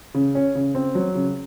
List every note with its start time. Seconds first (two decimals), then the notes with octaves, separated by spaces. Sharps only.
0.14 C#3
0.35 C#4
0.55 C#3
0.75 C4
0.95 F#3
1.15 C#3